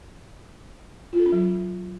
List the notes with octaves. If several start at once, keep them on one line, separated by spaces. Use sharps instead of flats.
F4
A4
C#4
F#3